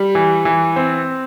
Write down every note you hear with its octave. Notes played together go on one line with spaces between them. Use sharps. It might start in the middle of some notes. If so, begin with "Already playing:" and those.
Already playing: G3
E3
E3
C4